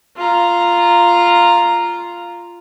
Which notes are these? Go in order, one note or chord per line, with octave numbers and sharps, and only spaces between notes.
F4 A#5